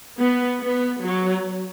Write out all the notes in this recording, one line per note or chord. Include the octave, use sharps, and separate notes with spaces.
B3
B3
F#3